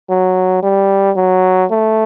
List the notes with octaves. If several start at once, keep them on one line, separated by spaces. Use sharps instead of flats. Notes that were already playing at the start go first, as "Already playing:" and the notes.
F#3
G3
F#3
A3